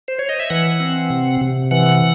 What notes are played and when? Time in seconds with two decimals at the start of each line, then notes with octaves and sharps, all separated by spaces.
0.08 C5
0.19 C#5
0.29 D#5
0.40 E5
0.50 E3 F#5
0.80 C4
1.10 C3
1.41 C3
1.71 E3 F#5